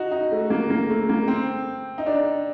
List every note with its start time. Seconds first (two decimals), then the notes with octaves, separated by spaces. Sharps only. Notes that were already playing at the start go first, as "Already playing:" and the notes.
Already playing: D#4 F#4
0.12 D#4
0.31 A3
0.50 A#3
0.70 A#3
0.90 A3
1.09 A#3
1.28 C4
1.98 D#4
2.06 D4